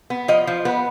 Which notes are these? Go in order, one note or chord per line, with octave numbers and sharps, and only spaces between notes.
B3
F3 D#5
F3
B3 B4